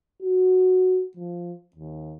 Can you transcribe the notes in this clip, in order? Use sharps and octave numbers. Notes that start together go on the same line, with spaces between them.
F#4
F3
D#2